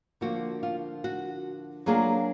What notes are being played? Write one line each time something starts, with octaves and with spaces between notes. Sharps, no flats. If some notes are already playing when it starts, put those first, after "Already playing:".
D3 F3 A#3 F4 F#4
F4
F#4
F#3 A#3 D4 F4 G#4